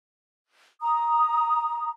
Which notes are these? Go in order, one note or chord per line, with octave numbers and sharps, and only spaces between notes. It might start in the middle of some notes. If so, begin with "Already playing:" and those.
A#5 D#6